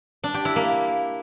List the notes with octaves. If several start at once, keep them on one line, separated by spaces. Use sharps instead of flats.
D4
G4
E4
A#3